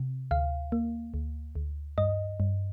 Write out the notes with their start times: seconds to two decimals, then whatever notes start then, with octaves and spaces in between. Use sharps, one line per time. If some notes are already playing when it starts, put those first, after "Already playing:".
Already playing: C3
0.31 D2 F5
0.72 A#3
1.14 D2
1.55 D2
1.98 G2 D#5
2.40 G2